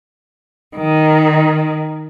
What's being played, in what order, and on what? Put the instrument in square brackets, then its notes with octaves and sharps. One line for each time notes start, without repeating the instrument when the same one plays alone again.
[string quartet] D#3